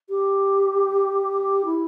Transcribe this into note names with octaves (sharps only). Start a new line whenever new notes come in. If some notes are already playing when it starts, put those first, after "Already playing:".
G4
E4